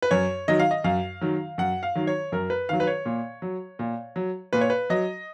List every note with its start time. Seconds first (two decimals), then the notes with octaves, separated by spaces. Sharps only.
0.02 B4
0.11 F#2 C#5
0.48 D#3 F#3 D#5
0.60 F5
0.71 D#5
0.84 F#2 F5
1.21 D#3 F#3
1.58 F#2 F#5
1.83 F5
1.95 D#3 F#3
2.07 C#5
2.32 F#2 A#4
2.50 B4
2.69 D#3 F#3 F5
2.80 B4
2.87 C#5
3.06 A#2
3.42 F#3
3.79 A#2
4.16 F#3
4.53 A#2 B4
4.61 C#5
4.70 B4
4.90 F#3 D#5